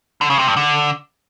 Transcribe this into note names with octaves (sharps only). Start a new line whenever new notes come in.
D3
C#3
C3
G2
D3